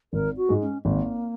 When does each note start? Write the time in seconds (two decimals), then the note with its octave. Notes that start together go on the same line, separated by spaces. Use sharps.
0.13 G#1 A#4
0.37 F#4
0.49 G#2 G#3
0.61 C#4
0.85 G#1 A#3